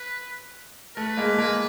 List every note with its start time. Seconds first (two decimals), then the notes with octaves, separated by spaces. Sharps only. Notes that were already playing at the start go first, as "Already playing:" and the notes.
Already playing: B4
0.97 A3 B4
1.17 G#3 A#3
1.38 G#3 A#3